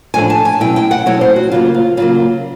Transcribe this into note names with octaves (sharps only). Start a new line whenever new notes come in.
A2 F3 A3 D4 G#5
A5
G#5
B2 F#3 A3 C#4 E4 G5
G5
F#5
B2 F#3 A3 C#4 E4 C#5
C5
F#4
C#3 F#3 A#3 F4
F4
C#3 F#3 A#3 F4